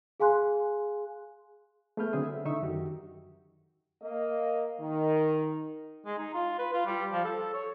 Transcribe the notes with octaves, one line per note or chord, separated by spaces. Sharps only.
G#4 F5 G#5 C6 F#6
A3 B3 G#4 B4 F6 G6
D3 F#3 C4 G#4 E5 D#6
E5
D3 D#4 E5 C#6
F#2 D#3 F#4 G4
A#3 D#5
D#3
G#3
D#4
F4
B4
F4
G3
F3
A4
C#5